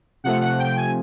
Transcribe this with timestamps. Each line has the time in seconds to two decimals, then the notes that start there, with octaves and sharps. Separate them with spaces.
0.24 C3 F3 A3 F#5
0.41 F#5
0.59 G5
0.77 G#5